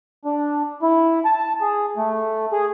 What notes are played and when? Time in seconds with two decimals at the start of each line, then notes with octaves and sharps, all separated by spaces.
0.25 D4
0.83 E4
1.25 A5
1.61 G#4
1.97 A3
2.53 G#4